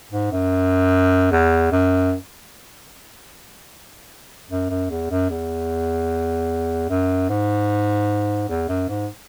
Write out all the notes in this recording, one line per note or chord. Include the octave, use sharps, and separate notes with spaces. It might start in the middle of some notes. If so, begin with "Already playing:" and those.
G#2
F#2
E2
F#2
F#2
F#2
E2
F#2
E2
F#2
G#2
E2
F#2
G#2